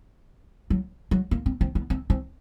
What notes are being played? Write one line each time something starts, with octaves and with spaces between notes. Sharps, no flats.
F#3
F#3
A#3
C4
C4
B3
C4
C4